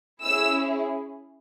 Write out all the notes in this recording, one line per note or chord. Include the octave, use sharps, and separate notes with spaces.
C#4 E4 G#4 E6